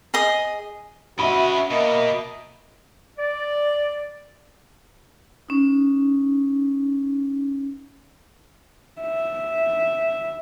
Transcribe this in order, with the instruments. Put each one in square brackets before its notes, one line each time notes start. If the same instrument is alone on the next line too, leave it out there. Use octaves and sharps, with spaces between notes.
[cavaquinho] G#4 D#5 D#6
[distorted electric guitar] C#4 D#5 [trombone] F#4 [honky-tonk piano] E5 B5
[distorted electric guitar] B2 [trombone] A#3 [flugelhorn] D#5
[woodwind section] D5
[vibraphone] C#4 D#4
[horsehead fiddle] E5